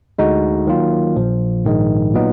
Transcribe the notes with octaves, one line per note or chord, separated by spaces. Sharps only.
D2 D3 G#3 D#4 F#4
D#3 F#3 A#3 F4
A#1 A#2 F3
A#1 G#2 D#3 G#3
A#2 F#3 B3 D#4